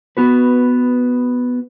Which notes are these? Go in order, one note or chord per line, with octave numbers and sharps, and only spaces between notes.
B3 F#4 B4